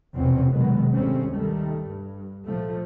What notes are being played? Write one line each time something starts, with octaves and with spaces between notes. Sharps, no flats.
F1 A#1 E2 B2 C4 C#4
B2 D#3 F#3 G#3 B3
G#1 D2 G3 A3 C4 C#4
D#3 G3 A3
G2
A#1 F3 A3